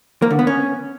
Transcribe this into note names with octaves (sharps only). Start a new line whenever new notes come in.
A#3
D3
B3
C#4